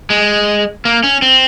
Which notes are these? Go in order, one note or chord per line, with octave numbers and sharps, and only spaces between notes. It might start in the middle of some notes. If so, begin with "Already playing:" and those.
G#3
A#3
C#4
C4